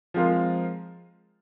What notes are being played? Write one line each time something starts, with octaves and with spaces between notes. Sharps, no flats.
F3 G#3 C4 F4 A#4